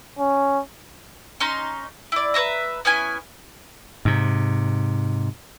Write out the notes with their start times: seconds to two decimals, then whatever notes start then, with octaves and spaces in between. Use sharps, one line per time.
0.19 C#4
1.40 C#4 D#4 C6
2.12 E4 D5
2.34 B4 C#5 E5 A#5
2.85 B3 C#4 E4 G#5
4.05 G#2 C3